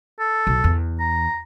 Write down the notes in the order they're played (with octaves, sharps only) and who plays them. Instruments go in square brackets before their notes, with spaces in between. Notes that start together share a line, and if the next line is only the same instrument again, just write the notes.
[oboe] A4
[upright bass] B1
E2
[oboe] A#5